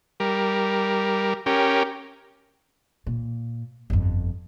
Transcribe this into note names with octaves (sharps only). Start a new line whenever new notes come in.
G3 A#4
C#4 G4 A#4
A#2
G1 F2